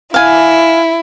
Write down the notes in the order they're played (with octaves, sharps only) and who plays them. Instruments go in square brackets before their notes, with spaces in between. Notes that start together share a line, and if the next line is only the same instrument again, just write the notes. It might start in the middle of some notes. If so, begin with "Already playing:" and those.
[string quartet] E4 [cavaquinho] F5 G#5